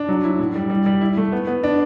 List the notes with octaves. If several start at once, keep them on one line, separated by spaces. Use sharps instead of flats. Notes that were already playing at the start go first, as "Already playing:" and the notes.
Already playing: D4
F#3
E4
A2
G3
G3
G3
E4
A3
B3
B3
D4